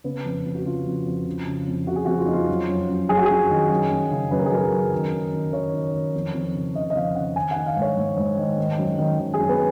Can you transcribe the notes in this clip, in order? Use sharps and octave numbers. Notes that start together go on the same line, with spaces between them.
C#3 B3
F2
F2
F#4
C#3 F4
F2
F2
C#3
C#3
F2
C#3 F#4
G#4
F2 F#4
F4
F2 D#4
F4
F#2
F#2
F#2
F#2 G#4
F#4
F#2 G#4
D#3
F#2
F#2
C#3
F#2 B4
A#4
G#4
F#2 A#4
F#2
D#3
D#3
D#3
D#3 C#5
D#3
D#3
F2
F2
C#3
C#3 D#5
D#5
F2 F5
C#3 F#5
D#3 G#5
F#5
D#3
F5
G#2
C#5
G#2
G#2
D#3
D#3
F#2
D#3
D#3
G#4
F#2
B3